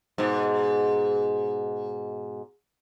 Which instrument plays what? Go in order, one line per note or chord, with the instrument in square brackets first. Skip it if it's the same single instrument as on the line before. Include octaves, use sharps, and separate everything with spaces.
[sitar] G#2 B2